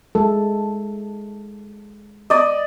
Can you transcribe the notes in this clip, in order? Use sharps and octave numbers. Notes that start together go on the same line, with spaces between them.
G#3 A4
D5 D#5